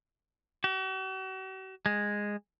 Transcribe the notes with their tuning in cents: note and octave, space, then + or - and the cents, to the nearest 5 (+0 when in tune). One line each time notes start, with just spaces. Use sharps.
F#4 +45
G#3 -10